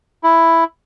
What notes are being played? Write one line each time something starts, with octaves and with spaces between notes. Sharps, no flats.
E4